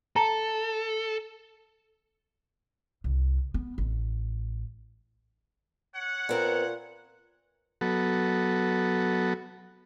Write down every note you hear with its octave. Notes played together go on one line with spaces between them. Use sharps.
A4 A5 A#5
C2
B3
A1
C#5 F#5
A#2 B3 C4 A#4
F#3 B3 F#4 A4